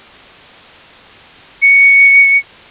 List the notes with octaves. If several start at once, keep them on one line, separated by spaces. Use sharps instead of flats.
C#7